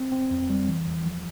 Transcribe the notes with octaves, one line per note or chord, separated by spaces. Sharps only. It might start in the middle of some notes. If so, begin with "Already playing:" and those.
Already playing: C4
C4
F2
G3
E3
E2
F3